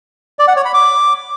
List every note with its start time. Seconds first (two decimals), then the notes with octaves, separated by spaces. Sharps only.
0.39 D5
0.48 F#5
0.56 C#5
0.65 B5
0.74 D6